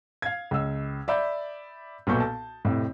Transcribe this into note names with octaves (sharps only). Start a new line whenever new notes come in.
F5 G#6
C#2 E6
D5 E5 B5 G6
B1 A#2 B3 A4 C#6 G6
A5
F2 A2 C3